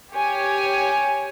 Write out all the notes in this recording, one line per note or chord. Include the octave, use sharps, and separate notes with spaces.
G4 C#5 G#5